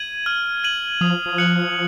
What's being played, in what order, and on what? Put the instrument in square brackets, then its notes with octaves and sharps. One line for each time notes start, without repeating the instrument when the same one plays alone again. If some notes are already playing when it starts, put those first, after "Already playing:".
Already playing: [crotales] G#6 D#7 F#7
F6
G#6 D#7 F#7
[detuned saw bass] F3 [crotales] D#6
[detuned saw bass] F3
[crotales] F#6 C#7 F#7